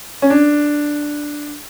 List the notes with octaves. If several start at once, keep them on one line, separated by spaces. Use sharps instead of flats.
C#4
D4